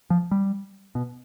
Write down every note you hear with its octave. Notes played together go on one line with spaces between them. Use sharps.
F3
G3
B2